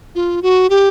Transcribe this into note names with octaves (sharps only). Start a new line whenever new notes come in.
F4
F#4
G4